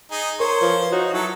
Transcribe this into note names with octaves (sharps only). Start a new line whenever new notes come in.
D#4 G#4
A#4 C5 C#5 A#5
F3 B4
D#4 F#4 C#5
F#3 E4 A4